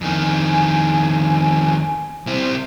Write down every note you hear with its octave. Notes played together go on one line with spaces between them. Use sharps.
F2 D#3 G#5
C3 E4 C5